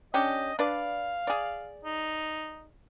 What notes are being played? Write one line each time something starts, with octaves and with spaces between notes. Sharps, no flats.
C#4 D4 G4 D#5
D4 B4 D5 F5
G#4 D5
D#4